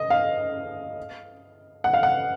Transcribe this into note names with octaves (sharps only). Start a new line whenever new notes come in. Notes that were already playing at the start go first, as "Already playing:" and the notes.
Already playing: D#5
F5
F#5
F5
F#5